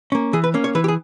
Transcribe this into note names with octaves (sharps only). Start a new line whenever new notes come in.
A#3 C#4
E3 G#4
B4
A#3 C#4
C#5
E3 B4
G4
G#4